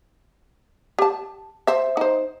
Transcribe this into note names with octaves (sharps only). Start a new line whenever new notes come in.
G4 A5
C5 E5
D#4 C5